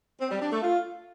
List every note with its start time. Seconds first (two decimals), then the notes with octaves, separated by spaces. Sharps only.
0.21 C4
0.31 G3
0.42 D4
0.52 A3
0.62 F4